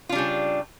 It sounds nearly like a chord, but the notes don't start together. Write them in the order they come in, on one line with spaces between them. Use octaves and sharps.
F4 D4 G3 C#3